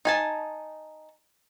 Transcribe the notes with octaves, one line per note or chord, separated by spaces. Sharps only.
D#4 G#5 A5